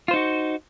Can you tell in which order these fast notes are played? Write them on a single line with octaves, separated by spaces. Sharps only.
F4 C5 D#4 F#4